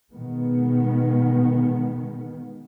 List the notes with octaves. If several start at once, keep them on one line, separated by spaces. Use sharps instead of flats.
B2 D#3 G#3 B3